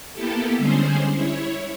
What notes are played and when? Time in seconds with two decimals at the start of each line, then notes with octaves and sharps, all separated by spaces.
0.13 A#3 B3 E4 G4 A4
0.57 D3 G3 G#3 C#4 G#4 C5
1.14 E4 C#5